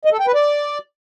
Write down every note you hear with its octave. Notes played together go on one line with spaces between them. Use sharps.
D#5
A4
G5
B4
D5